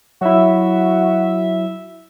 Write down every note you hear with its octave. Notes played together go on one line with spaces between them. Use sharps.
F#3 E4 F#4 E5